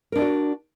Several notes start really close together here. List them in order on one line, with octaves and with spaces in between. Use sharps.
A#4 D4 D5 F#4